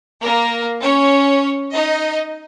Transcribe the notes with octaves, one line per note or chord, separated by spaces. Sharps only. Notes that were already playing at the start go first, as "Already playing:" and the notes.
A#3 A#4
C#4 C#5
D#4 D#5